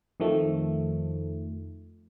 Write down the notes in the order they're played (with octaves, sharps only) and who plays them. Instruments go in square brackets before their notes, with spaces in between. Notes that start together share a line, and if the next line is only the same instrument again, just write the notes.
[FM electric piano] F2 D#3 F3 A3